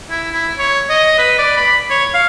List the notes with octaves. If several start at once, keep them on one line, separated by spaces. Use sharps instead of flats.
E4
E4
C#5
D#5
B4
D5
B5
C#5
F5